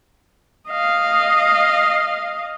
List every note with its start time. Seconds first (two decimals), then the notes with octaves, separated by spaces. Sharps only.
0.68 D#5 F5